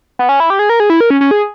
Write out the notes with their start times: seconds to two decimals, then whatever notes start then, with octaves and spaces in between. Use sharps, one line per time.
0.19 B3
0.29 C#4
0.40 E4
0.50 G4
0.59 G#4
0.69 A#4
0.80 G#4
0.90 E4
1.01 A#4
1.10 C#4
1.21 C#4
1.31 G#4